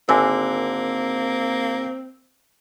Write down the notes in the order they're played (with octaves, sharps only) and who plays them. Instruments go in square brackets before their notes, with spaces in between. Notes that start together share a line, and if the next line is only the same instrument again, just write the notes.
[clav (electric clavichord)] G#1 D3 [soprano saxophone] A#3 [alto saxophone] C4 [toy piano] E5 G#5 E6